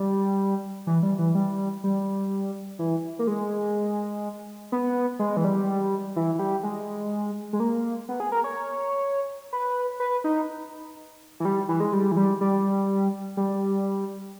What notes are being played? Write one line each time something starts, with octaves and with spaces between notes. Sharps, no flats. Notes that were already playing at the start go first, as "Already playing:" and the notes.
Already playing: G3
E3
G3
E3
G3
G3
E3
A#3
G#3
B3
G#3
E3
G3
E3
E3
G3
G#3
G#3
A#3
B3
G#4
A#4
C#5
B4
B4
D#4
E3
G3
E3
G#3
G3
E3
G3
G3
G3